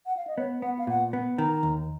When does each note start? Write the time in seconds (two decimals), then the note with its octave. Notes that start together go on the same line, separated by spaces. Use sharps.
0.06 F#5
0.17 F5
0.27 D#5
0.38 B3 C#5
0.62 B3 F#5
0.79 F5
0.87 A#2 F#5
1.13 B3
1.38 D#3 A#5
1.63 D#2